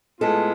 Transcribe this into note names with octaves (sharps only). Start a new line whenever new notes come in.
A2 G#3 B3 F4 A4